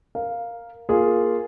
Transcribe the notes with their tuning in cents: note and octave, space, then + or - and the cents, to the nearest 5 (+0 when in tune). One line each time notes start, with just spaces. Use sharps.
A#4 +0 F5 +0
A#3 +10 F4 +0 G#4 +0